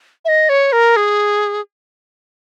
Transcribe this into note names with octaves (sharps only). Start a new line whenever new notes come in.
E5
D#5
C#5
A#4
G#4